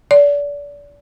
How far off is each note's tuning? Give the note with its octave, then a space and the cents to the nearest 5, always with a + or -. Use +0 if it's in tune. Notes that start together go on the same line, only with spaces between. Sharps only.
D5 -30